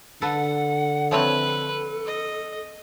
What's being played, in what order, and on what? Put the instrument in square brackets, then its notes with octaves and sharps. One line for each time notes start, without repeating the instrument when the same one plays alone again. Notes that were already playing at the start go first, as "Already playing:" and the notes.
[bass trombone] D3 [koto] A4 B4 [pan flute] F#5
[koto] F3 A3 C4 [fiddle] B4 [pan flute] C#5
[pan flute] A4
[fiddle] D#5